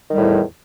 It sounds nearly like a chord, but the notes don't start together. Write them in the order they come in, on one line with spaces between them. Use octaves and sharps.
D#3 G3 A2 E2